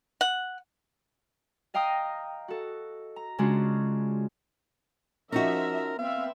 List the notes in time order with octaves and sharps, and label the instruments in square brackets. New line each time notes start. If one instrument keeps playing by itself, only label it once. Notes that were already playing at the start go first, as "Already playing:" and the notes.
[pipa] F#5
[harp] D#5 F5 G5 A#5 D#6
F#4 A4
A#5
C#3 G#3 C#4 D4 F4 F#4
[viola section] F3 E5 [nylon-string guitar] C#4 D#4 F#4 [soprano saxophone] A#4
[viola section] B3 C4 E5 [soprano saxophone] F5